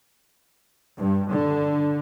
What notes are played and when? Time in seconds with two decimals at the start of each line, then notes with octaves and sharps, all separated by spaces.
0.97 G2
1.31 D3